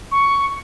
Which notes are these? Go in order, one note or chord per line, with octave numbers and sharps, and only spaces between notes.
C#6